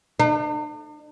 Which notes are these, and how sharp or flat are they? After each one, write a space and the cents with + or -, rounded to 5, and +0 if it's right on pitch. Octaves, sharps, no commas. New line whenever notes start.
D4 +45